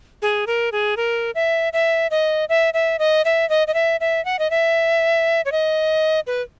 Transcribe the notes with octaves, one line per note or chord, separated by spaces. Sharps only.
G#4
A#4
G#4
A#4
E5
E5
D#5
E5
E5
D#5
E5
D#5
D#5
E5
E5
F#5
D#5
E5
C#5
D#5
B4